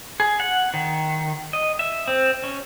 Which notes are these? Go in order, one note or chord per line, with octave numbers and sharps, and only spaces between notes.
G#4
F#5
D#3
D#5
E5
C4
C#4